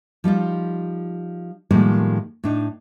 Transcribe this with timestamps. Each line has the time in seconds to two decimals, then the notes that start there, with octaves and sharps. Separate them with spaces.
0.24 F3 G3 D#4 F4
1.71 A2 D#3 F3 G3 G#3 A#3
2.44 A2 D4 D#4